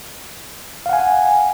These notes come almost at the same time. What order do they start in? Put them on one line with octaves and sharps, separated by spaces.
F5 F#5 G#5